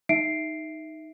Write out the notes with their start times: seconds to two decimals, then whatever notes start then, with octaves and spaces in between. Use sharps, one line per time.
0.09 D#4 E5 C7 D7